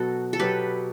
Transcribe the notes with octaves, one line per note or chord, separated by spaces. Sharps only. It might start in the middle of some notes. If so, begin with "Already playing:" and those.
Already playing: B2 F#3 B3 F#4 A4
A4
B2 F#3 B3 G4 B4